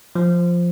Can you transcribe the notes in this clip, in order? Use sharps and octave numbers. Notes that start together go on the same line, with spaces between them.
F3